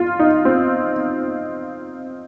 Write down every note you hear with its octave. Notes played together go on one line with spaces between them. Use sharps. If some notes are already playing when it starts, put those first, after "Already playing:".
Already playing: F4
D#4
C4